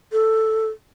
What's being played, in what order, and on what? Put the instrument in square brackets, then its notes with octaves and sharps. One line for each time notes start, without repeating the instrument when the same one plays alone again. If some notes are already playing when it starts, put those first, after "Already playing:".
[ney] A4